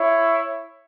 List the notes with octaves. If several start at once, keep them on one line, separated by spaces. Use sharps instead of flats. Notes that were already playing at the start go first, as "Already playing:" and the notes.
Already playing: E4 C#5 E5